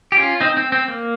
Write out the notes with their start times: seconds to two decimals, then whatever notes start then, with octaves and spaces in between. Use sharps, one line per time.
0.12 G4
0.17 C#4 F4
0.41 C4 D#4
0.57 C4
0.72 C4
0.88 A#3